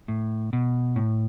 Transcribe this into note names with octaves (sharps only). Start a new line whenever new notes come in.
A2
B2
A2